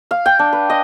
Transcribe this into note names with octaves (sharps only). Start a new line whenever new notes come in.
F5
G5
D4
B4
D#5